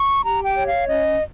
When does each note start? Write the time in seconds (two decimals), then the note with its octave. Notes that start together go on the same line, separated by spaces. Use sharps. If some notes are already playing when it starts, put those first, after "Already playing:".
Already playing: C#6
0.24 G4 A#5
0.44 G5
0.56 C#5
0.67 F5
0.87 C#4 D#5